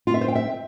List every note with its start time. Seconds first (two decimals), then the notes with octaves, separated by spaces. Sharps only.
0.07 F4
0.14 E5
0.21 C5
0.28 G5
0.35 E5